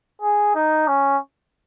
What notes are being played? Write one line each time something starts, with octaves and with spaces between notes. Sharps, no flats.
G#4
D#4
C#4